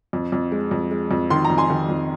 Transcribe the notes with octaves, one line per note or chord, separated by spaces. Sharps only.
F2
F2
G#3
F2
G#3
F2
D#3 C6
A#5
F2
G#5 C6
D#3
F2